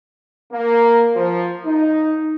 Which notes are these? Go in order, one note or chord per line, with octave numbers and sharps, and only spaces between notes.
A#3
F3
D#4